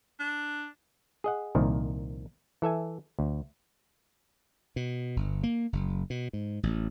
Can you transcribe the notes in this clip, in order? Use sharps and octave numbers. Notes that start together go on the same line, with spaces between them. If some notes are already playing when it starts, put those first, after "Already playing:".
D4
G#4 D#5 F#5
C2 A#2 D#3 F3
E3 A4 E5 G#5
D2
B2
G1
A#3
F#1
B2
G#2
A1